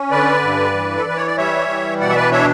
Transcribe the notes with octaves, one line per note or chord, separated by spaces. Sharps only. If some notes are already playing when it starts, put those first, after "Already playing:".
Already playing: C#4
D3 B4 D5
G2
E3
A4
E3 B4
C#5
D5
G3 C#5 E5
E3
B2 D5 F#5
E5
B4 D5
D4 C#5 E5